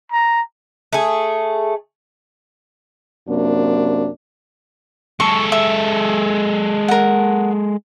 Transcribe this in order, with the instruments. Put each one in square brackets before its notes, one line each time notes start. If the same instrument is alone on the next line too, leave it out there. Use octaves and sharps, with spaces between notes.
[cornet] A#5
[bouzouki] A3 G#4
[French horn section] F#2 C3 A#3 D4
[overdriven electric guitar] G#3 A4 [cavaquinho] C#6
[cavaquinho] E5
A#4 F#5